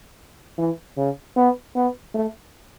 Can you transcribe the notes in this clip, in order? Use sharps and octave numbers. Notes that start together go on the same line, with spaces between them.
E3
C#3
B3
B3
A3